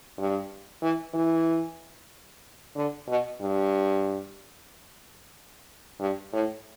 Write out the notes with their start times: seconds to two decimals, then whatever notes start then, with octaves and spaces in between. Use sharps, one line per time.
0.18 G2
0.82 E3
1.14 E3
2.76 D3
3.08 B2
3.41 G2
6.00 G2
6.33 A2